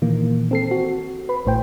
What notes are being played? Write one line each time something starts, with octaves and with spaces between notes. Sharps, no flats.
A#2 D#3 E3 A#3
C4 A4 C7
F#4
B4 B5
A1 A2 C5 G5